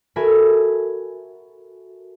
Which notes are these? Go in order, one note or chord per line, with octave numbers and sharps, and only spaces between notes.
F#4 A4 A#4 E5 G#5 B5